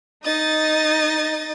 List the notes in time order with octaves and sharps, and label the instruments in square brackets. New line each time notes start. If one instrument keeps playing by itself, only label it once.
[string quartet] D#4 D#5 A6